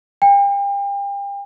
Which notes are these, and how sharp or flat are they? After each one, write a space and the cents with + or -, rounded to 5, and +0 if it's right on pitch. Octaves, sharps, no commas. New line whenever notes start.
G5 +35